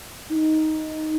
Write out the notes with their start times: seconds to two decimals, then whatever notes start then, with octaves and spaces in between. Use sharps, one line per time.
0.29 D#4